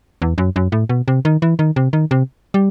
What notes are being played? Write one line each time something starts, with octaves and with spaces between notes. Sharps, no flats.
E2
F#2
F#2
A2
B2
C3
D#3
E3
D#3
C3
D#3
C3
G3